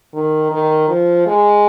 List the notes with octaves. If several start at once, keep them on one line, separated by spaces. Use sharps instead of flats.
D#3
D#3
F3
G#3